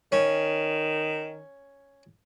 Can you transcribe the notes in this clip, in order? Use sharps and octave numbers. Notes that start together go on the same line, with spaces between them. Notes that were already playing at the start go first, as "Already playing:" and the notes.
D#3 C#4